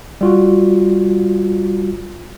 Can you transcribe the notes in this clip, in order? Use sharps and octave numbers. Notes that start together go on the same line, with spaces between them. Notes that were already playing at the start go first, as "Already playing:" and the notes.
G3 F4 F#4